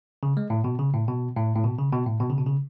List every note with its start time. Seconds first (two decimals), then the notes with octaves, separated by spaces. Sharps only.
0.23 C#3
0.37 G#3
0.50 A2
0.64 B2
0.79 C#3
0.94 A2
1.08 B2
1.36 A2
1.56 A2
1.64 B2
1.79 C#3
1.93 B2
2.07 A2
2.20 B2
2.30 C#3
2.38 B2
2.47 C#3